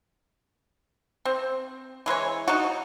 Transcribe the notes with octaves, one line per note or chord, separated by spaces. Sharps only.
C4
E3 G#3 B4 C#5
D#4 F#4